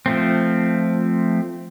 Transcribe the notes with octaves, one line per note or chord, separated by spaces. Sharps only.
F3 A3 C4